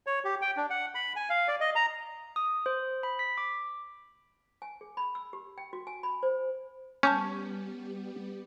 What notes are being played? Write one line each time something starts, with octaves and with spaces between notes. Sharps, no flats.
C#5
G4
G5
D4
F#5
B5
G#5
F5
D5
D#5
A#5
D#6
C5
B5
B6
D6
G#5
G#4
B5
E6
G4
G5
F#4
G#5
B5
C5
G3 B3 C#4 G4 A5 C#6 G6